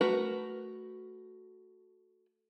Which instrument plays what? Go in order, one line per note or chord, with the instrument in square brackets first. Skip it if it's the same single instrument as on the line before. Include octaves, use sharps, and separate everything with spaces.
[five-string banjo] A3 F#4 A#4 B4